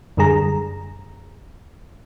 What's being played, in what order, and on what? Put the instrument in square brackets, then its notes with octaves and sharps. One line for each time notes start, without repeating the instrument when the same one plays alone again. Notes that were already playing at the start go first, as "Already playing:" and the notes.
[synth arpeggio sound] F#2 D3 G3 G#4 A#5